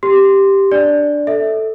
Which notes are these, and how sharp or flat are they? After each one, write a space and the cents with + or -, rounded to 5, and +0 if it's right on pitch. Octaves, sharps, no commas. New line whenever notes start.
G4 +0 C6 +0
D4 +0 D5 +0
A4 +0 E5 -20